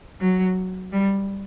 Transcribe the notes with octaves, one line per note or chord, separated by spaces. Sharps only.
F#3
G3